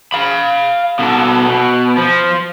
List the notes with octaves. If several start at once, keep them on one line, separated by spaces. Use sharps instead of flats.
F5 B5
B2 A4
B2
F3